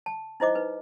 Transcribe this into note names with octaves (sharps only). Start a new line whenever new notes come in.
A5
D#4 E4 C5 D#5 D6
D#4 B4